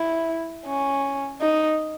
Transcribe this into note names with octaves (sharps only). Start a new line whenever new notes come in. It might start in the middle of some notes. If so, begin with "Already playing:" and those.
Already playing: E4
C#4
D#4